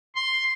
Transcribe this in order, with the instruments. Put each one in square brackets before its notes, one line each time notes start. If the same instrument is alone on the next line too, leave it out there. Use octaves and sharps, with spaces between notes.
[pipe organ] C6